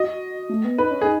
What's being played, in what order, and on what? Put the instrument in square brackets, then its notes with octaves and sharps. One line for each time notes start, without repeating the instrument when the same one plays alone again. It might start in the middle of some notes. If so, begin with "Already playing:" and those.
Already playing: [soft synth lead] F#4 [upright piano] D#5
[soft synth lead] A3
B3
[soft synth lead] D#4 [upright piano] B4
[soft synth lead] C#4
[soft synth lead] D#4 [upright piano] G#4